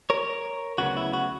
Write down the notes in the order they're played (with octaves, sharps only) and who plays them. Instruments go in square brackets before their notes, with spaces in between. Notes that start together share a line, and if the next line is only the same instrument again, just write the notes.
[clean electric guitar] A#4 C#5
D2 C#3 F#3 B3 F#4
E4
F#4